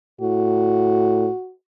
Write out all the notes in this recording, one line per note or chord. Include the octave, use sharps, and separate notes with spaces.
A2 F#4